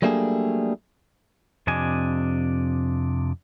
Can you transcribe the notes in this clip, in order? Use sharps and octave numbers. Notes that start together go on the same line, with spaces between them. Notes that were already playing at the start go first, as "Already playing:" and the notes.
F#3 G3 A3 A#3 D4 G#4
F2 C3 D4 D#5 G#5